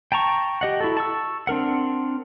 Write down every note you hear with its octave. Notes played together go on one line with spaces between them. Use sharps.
G5 A5 A#5 C#6
G4 D#5 F#5
E4 F#4 A4
A5 C#6 E6
C4 D4 A#4 F#5